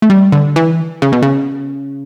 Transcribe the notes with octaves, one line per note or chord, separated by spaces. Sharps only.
A3
G3
D3
E3
C#3
B2
C#3